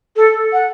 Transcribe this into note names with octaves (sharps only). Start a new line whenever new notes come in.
A4
F#5